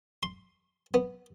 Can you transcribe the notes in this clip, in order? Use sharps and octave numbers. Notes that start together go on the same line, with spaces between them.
C6
B3